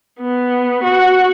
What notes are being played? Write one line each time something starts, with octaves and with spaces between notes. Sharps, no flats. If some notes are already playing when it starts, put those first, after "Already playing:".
B3
F#4